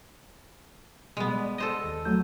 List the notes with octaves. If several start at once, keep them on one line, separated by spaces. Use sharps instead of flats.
B2 G3 G#3 B3
D5
A4 C5 D#5
D#2
F#3 A3 G6